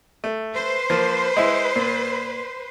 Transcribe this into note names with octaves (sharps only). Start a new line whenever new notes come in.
A3
B4 C5
F3 A#3
G#3 E4
A#2